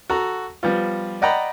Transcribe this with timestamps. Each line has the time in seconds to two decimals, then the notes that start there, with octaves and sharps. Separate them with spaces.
0.10 F#4 A4 A#5
0.63 F3 G3 B3 F4
1.22 D5 D#5 F#5 G5 A#5 B5